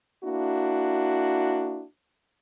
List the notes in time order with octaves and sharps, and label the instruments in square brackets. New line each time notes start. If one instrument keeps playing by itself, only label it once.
[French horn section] A#3 D4 E4 F#4